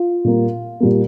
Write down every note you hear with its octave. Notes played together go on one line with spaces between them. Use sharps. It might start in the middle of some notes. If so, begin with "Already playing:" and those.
Already playing: F4
A#2 G3 A#3
A#2 G3 A#3